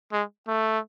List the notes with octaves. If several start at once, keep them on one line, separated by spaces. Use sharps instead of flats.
G#3
A3